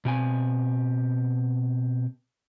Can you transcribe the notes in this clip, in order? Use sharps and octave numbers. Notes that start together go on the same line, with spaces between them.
B2 C4 G#5